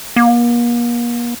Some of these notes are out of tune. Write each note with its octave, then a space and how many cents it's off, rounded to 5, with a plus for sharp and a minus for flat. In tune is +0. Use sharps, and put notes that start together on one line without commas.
A#3 +40